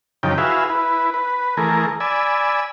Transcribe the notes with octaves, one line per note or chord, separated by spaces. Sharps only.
F#2 C#3 F3 D#4 G5
E4 F#4 G#4 B4 E5 F5
E4 B4
B4
E3 A3 G#4 A#4
D5 G#5 B5 E6